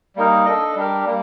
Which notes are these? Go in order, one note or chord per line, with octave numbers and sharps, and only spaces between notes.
G3 A#3 D#4 A#4
D4 A4 D#5
G3 D4 G4 A#4
G3 A#3